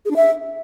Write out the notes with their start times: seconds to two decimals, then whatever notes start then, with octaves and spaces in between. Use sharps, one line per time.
0.05 G#4
0.11 D4
0.16 E5